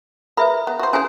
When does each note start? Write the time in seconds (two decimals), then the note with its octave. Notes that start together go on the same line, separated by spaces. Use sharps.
0.37 G#4 A#4 B4 E5 B5
0.67 B3
0.79 F#4 C5
0.93 E3 C#4 G#4 C5 G#5